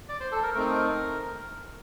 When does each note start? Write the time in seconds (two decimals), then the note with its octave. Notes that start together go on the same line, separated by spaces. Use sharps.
0.09 D5
0.20 C5
0.32 A4
0.43 A#4
0.54 A3 C4 D#4 A#4